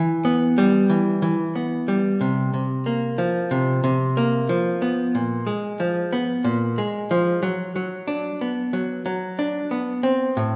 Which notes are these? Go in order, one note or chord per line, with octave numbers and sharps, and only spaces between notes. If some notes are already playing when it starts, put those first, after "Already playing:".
Already playing: E3
B3
G3
E3
E3
B3
G3
C3
C3
A#3
F3
C3
C3
A#3
F3
B3
A#2
G#3
F3
B3
A#2
G#3
F3
F#3
F#3
D4
B3
F#3
F#3
D4
B3
C4
A2